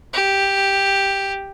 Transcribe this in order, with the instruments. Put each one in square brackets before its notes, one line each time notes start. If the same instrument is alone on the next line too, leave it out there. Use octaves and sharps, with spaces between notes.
[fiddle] G4